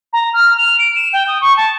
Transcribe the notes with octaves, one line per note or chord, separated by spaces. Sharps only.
A#5
F6
F7
D7
E7
G5
D#6
C#6
A5